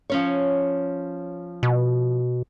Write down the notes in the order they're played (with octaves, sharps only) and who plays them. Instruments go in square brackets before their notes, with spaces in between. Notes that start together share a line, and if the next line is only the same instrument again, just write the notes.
[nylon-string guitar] F3 C#4 C#5
[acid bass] B2